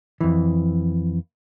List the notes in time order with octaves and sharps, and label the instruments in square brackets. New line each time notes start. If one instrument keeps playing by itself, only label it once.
[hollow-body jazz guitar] F2 E3